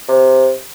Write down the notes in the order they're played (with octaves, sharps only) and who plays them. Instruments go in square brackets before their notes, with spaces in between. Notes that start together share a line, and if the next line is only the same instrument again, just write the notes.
[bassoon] C3